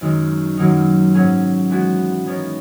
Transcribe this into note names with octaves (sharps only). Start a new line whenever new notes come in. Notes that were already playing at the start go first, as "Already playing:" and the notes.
F#2 D#3 G#3 D#4
F#2 D#3 F#3 A#3 D#4
G#2 F#3 C#4 G#4
E3 G#3 B3 F#4
E3 B3 D#4 A#4 C#5